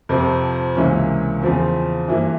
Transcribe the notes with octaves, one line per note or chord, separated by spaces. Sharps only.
F2 C3 F3 C4
C#2 C3 E3 A#3 C#4
E2 C#3 F3 C4
G2 E3 A#3 E4